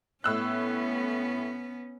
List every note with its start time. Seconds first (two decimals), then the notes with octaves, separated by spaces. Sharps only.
0.24 A2 B3 C#4 E6 F#6